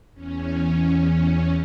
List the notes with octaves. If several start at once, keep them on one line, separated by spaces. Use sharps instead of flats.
E2 C#4